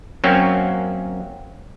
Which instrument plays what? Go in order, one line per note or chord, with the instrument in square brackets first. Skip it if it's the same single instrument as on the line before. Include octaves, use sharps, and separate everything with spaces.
[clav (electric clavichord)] F#2 F#3 A#3 C4 C#4